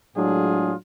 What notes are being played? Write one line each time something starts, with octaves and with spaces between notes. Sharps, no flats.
A2 F#3 G#3 D4 F4 G#4